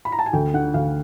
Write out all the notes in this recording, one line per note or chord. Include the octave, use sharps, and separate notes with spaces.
B5
A#5
A5
G#5
D2 G5
D3 F#5
D2 F5